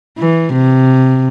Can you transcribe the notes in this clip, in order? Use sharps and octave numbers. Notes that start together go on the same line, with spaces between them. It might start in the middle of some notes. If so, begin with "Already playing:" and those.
E3
C3